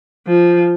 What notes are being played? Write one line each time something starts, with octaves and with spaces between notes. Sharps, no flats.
F3